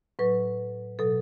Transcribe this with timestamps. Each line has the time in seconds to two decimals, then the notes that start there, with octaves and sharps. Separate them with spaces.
0.19 A2 F#3 B4
0.99 B2 F#3 A4